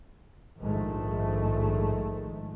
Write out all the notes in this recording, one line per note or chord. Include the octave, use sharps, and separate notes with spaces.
A#1 G#2 D#3 G#3 A3